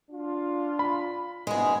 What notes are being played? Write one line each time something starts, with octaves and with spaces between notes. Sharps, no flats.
D4 F4
B5
C2 G2 B2 G#3 G#4